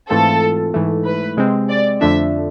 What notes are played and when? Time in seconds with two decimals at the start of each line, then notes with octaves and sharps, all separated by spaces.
0.10 G#2 E3 A3 C4 F4 A4
0.74 G#2 E3 A3
1.05 B4
1.37 C3 G#3 C4
1.70 D5
2.01 F2 D3 F3 A3 D4 E5